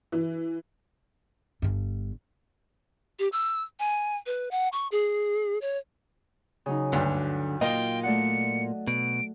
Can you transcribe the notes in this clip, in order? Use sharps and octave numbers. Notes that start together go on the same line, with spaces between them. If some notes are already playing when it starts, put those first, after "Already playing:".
E3
G1 G2
G4
E6
G#5
B4
F#5
C#6
G#4
C#5
C#3 F#3 D#4
D2 G2 D3 D6
A#2 A#3 F4 D#5 G5
A3 D5 F#5 C#7
B2 D7